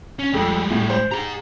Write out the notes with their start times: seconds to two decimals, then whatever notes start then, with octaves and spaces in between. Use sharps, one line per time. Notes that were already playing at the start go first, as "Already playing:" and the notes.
0.19 C#4
0.34 F2 G3 G#3 A4
0.70 A2
0.90 C5
1.11 G4 G#4 A#5